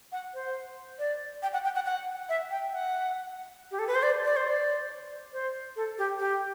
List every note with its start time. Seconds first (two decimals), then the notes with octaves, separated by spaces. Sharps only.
0.12 F#5
0.34 C5
0.99 D5
1.43 G5
1.53 F#5
1.64 G5
1.75 F#5
1.86 F#5
2.29 E5
2.51 G5
2.73 F#5
3.71 G4
3.79 A4
3.87 B4
3.95 C5
4.03 D5
4.25 D5
4.36 C5
4.48 D5
5.33 C5
5.76 A4
5.98 G4
6.20 G4